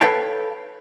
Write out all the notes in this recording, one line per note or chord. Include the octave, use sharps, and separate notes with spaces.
A4 B4 C#5 F5 G5 A5